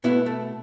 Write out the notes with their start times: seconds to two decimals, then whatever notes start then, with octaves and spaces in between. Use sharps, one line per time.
0.04 B2 A3 B3 E4
0.26 A3